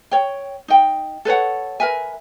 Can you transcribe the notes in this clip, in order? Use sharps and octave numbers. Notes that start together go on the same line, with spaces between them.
C#5 G5
D#4 G5
A4 B4 C#5 F#5
A#4 B4 E5 G#5